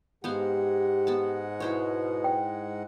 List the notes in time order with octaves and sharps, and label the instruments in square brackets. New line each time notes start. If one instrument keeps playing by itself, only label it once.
[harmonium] G#2 G#3 F#5 [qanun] B3 C5 F5 [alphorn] G4
[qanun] B3 A5
[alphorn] B2 [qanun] E4 C5 C#5
[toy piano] G5